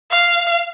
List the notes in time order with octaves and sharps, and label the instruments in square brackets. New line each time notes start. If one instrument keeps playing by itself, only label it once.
[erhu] F5